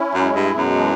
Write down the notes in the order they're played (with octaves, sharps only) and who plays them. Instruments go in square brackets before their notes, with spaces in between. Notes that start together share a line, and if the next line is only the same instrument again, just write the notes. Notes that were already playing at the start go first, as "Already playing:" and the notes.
Already playing: [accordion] C#4 E4
[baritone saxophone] F#2
[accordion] G#3
[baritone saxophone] G2
[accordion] B2
[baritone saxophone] F#2
[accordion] E3